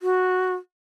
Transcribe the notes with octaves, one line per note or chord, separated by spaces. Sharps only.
F#4